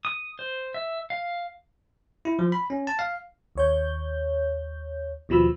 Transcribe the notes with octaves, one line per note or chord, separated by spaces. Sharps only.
D#6
C5
E5
F5
E4
F3
B5
C#4
A5
F5
D#2 C#5 G6
D#2 B2 F3 B5 E6